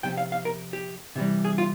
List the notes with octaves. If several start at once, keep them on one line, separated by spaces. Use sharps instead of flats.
C3 F3 G5
F5
F5
A#4
G4
C3 E3 G3
G#4
F4